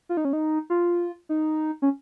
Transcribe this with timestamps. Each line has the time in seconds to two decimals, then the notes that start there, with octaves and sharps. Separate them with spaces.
0.09 F4
0.17 D#4
0.25 C#4
0.33 D#4
0.70 F4
1.29 D#4
1.82 C#4